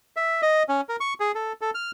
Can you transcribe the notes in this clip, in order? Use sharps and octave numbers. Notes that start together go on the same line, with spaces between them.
E5
D#5
C#4
A#4
C#6
G#4
A4
A4
F6